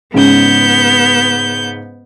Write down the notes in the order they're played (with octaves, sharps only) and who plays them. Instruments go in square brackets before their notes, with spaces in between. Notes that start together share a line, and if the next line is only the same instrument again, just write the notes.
[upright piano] G#2 C#3 [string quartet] B3 G6